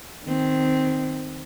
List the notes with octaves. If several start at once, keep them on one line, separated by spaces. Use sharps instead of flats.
D#3 C4